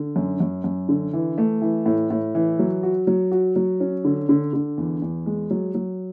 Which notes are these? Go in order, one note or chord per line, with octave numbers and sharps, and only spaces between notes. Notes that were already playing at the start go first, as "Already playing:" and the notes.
Already playing: D3
F#2
F#2
F#2
D3
E3
A3
E3
A2
A2
E3
F#3
F#4
F#3
F#4
F#3
C#4
D3
D3
D3
E2
E2
G#3
F#3
F#3